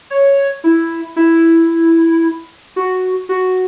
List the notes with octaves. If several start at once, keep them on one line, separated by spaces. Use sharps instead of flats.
C#5
E4
E4
F#4
F#4